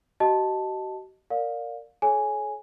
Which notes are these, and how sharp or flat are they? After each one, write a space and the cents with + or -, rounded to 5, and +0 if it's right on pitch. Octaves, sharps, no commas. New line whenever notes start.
F#4 +45 D#5 +0 A5 +0
A#4 -15 D5 +0 F5 +25
A4 -45 C#5 -5 G#5 +0